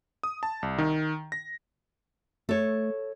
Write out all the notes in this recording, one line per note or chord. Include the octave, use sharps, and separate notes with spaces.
D#6
A5
C2
D#3
A#6
A3 A4 C#5